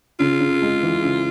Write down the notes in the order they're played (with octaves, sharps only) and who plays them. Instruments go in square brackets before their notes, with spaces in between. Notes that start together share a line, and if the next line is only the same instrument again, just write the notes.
[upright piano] C#3 [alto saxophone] F4
[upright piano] C#3
G#3
E3
C#3